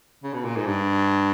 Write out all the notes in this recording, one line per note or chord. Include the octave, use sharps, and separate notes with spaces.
C#3
B2
A#2
G#2
G2